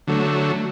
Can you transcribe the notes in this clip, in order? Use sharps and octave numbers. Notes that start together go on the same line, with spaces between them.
D3 F#3 A3